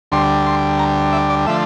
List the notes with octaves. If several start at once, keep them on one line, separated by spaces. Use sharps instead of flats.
D2 D3 G3 C6
C6
A#5
E5
D5
D3 F3 A3 E5